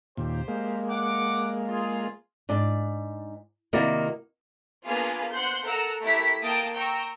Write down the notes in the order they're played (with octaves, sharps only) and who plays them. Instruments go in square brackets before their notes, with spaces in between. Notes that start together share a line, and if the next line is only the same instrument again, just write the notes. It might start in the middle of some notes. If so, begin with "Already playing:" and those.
[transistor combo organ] D#2 A#2 [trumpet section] G4 C5
[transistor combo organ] G#3 A#3
[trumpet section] F#5 D6
F4 G#4
[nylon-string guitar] G#2 D4 D5
C3 D#3 A#3 E4 F#4 D5
[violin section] A#3 B3 D4 F4 G#4 F5
C5 F#5 C6 F#6 G6
A4 A#4 F#5 A#5 E6
A3 E4 G4 A#4 B6
A#3 G5 A5 D#6 A6 D7
G5 A#5 C#6 E6